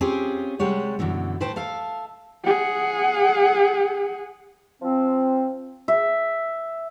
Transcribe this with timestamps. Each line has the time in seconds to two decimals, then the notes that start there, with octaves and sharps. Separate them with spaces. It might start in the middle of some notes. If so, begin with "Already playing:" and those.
0.01 C4 C#4 F4 G4 G#4 C#5
0.59 C3 G3 G#3 C#5 F#5
0.99 F#2 B2 D3 E3
1.40 A2 B4 C5 G5 A5
1.56 A4 E5 F5
2.44 G#4 F#5
4.82 F3 C4
5.88 E5